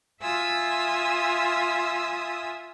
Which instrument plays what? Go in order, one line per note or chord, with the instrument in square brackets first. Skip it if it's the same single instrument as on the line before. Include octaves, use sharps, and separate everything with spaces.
[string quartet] F4 E5 G#5 D#6 E6